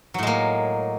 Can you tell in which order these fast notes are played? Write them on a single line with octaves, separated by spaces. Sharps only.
F#3 A2 G#3 A#3